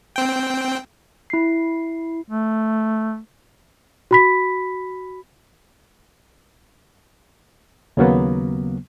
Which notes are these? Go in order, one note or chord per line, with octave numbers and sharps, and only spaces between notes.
C4 G5
E4 C7
A3
F#4 B5 B6
D#2 C#3 F#3 A#3 B3